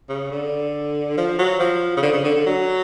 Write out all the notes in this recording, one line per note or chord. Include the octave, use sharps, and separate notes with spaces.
C#3
D3
F3
F#3
F3
C#3
D3
C#3
D3
D3
F#3